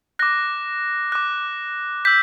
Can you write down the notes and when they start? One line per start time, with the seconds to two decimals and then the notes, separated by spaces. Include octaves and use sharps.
0.19 D6 F#6 A#6
1.12 D6 F#6
2.05 E6 G6 B6